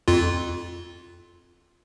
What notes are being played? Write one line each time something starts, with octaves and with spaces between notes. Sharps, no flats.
F2 F4